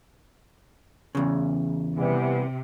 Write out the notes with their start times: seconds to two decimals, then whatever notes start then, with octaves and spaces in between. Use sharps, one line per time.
1.15 E2 C#3
1.98 C3 E3 G3 B3